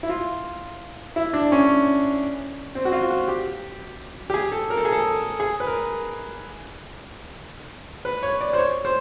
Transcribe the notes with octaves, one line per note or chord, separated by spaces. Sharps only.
E4
F4
E4
D4
C#4
C4
F#4
F4
F#4
G4
G4
G#4
A4
A#4
A4
G#4
A4
G#4
B4
A#4
B4
C#5
D5
C5
C#5
C5